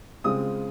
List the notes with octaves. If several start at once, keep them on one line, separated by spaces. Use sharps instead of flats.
C#3 G#3 C4 F4 D#6